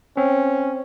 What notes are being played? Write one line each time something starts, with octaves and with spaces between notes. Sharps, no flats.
C4 C#4